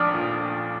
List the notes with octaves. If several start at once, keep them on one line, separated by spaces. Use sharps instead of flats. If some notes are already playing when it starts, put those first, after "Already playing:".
Already playing: A#1 A3 D4 D6 D#6 F6
A#2